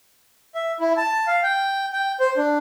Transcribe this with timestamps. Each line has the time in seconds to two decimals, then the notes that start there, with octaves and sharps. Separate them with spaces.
0.55 E5
0.80 E4
0.97 A5
1.27 F5
1.43 G5
1.93 G5
2.20 C5
2.37 D4